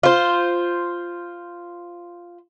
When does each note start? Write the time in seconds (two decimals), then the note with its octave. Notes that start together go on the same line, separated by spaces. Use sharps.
0.03 F4 C5